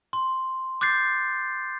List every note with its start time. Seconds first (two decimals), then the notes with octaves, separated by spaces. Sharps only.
0.13 C6
0.81 D6 F#6 G6 A6 C7